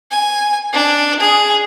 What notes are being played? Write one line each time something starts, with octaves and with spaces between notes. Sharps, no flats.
G#5
D4
G#4